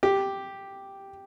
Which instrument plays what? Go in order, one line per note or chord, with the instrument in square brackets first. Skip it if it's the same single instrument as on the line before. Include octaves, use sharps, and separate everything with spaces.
[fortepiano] G4